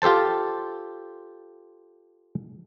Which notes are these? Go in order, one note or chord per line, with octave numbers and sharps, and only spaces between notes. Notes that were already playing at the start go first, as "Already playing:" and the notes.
F4 G4 A4 C5 A5